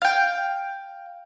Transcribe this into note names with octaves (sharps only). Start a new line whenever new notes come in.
F5 G5